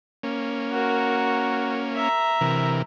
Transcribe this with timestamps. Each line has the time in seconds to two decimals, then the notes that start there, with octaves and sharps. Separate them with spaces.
0.23 A#3 C#4
0.71 F#4 A#4
1.95 E5 A#5
2.41 C3 E3 A#4